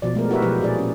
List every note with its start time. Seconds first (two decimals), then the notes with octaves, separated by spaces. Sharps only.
0.02 B2 F3 D5
0.15 G#3 A3 A#4
0.30 E4 F#4 G4 A#4 B4 E5
0.42 B2 F3 F#3 G#3 G4 B4
0.61 A#2 G#4 D5
0.79 C#4